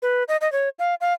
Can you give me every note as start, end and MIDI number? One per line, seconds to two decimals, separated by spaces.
0.02 0.24 71
0.28 0.37 75
0.41 0.51 75
0.52 0.69 73
0.79 0.95 77
1.01 1.13 77